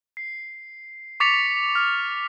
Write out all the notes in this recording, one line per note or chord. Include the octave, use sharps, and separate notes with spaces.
C7
C#6 D6 A6 B6 C#7 F7
F6